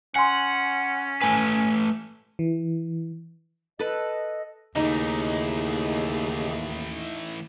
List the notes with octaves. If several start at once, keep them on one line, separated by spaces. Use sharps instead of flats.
C#4 F#5 G#5 C6
A3 B4 G#5
E3
A4 B4 D#5
D#2 C#3 E3 A3 D#4 G4 G#4